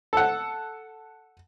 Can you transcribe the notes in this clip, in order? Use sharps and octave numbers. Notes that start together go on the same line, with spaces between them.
A4 F#5